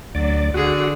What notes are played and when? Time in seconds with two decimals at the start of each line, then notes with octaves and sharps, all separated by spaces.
0.15 D2 F#3 D5
0.54 D3 F#4 G#4